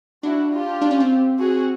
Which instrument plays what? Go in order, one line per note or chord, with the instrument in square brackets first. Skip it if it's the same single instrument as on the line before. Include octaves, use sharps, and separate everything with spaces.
[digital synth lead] D4 [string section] E4 F#4
[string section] F4 G4
[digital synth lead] D4
C#4
C4
[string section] F#4 G#4